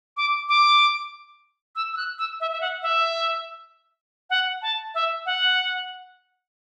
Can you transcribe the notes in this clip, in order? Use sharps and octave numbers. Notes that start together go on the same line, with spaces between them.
D6
D6
E6
E6
F#6
E6
E5
E5
F#5
E5
F#5
A5
E5
F#5